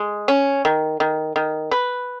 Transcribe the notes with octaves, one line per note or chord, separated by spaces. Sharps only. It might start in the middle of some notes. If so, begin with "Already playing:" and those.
Already playing: G#3
C#4
D#3
D#3
D#3
B4